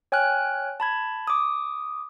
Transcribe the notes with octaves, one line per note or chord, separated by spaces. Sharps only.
C#5 G5 G#5 F6 F#6
A5 B5 G#6
D6 D#6